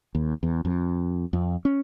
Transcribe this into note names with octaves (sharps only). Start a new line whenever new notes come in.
D#2
E2
F2
F2
C#4